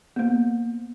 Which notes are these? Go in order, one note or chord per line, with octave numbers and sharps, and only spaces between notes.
A#3 B3